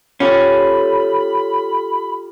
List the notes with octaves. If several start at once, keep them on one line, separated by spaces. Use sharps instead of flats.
C#4 F4 G4 A4 B5